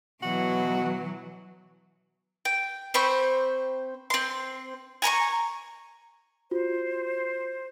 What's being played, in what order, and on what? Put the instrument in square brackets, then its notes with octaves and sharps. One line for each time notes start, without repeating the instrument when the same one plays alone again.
[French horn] B2 [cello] E3 F#3 [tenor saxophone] F#4
[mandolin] G5
C4 C5 B5 C#6
C4 C6
G#5 A#5 B5 C#6
[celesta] F4 F#4 [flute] C5